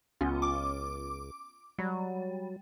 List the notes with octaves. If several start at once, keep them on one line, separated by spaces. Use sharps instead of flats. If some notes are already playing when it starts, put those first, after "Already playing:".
C#2 B3 C#4 F4
D6
F#3 G3